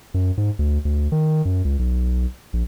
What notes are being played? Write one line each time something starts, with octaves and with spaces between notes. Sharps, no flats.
F#2
G#2
D2
D2
D#3
F#2
C#2
B1
A#1